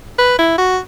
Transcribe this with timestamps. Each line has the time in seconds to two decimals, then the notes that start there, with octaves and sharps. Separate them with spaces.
0.19 B4
0.39 E4
0.58 F#4